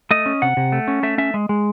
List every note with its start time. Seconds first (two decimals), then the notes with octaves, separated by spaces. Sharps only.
0.11 A3 D#5
0.26 C#4
0.42 C3 F#5
0.57 C3
0.72 A3
0.88 C#4
1.03 A3 E5
1.18 C#4 E5
1.34 G#3
1.49 G#3